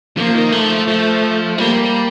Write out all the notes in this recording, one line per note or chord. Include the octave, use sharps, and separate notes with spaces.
F3 A#3
D#3
F3 A3
F3
G3 A#3